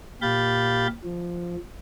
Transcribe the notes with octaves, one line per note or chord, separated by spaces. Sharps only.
A#2 G4 F5 B5 G6 A6
F3